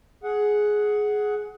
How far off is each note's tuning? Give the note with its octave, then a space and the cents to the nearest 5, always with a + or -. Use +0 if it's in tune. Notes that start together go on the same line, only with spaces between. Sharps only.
G#4 +10 F#5 +0